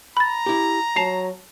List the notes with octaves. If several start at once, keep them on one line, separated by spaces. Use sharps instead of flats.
A#5 B5 A6
E4 G4
F#3 A5 C7 F7